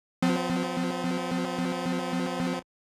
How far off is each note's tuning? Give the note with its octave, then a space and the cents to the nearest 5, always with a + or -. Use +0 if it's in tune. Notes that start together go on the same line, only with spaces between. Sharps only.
F3 +30 C4 -35